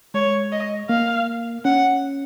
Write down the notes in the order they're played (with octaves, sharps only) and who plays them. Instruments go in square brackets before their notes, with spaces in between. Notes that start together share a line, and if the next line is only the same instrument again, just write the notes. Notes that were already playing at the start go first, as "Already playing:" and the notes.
[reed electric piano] G#3 [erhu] C#5
[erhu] D#5
[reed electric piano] A#3 [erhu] F5
[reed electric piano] C#4 [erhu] F#5